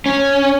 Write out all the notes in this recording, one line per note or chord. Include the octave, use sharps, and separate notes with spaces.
C#4